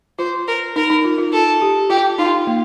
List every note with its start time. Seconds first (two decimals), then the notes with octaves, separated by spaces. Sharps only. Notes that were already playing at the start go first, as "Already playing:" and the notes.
0.19 F4 C5
0.48 A#4
0.76 D#4 A#4
0.90 D#4
1.05 F4
1.18 F4
1.33 F4 A4
1.62 G4
1.90 F4 G4
2.18 D#4 F4
2.47 A#3